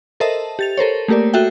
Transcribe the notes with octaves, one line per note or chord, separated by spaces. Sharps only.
A4 A#4 C5 D#5 E5 A5
G4 A6 F7
A4 A#4 C5 C#5
A3 A#3 G4 A#4 D5
F#4 A4 E5 F#5 G5